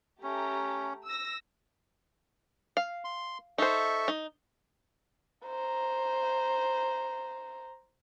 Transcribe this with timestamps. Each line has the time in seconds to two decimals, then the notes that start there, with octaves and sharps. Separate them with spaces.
0.23 A3 C#4 G4 A#5
1.05 E6 A#6
2.77 F5
3.04 C6
3.58 D#4 A4 C5 E5 C#6
4.08 D#4
5.46 C5 A#5